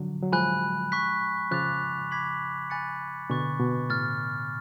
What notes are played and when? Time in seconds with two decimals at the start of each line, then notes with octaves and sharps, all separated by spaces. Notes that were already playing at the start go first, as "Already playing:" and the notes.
Already playing: D3 F3 F#3
0.22 F#3
0.32 F3 G#3 G#5 B5 F#6
0.92 C#6 F#6 B6
1.51 C#3 F3 D6 F#6 A6 F7
2.11 B5 D6 G#6 B6 F#7
2.70 G#5 B5 F#6 A6 C#7
3.29 B2 D3 G#5 C#6 F#6 A6
3.60 B2
3.89 A2 F6 A6